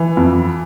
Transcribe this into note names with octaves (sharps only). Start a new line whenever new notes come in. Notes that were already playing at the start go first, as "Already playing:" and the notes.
Already playing: E3
F2